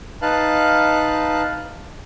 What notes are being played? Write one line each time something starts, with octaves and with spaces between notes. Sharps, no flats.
D#4 B4 F5 A5 F#6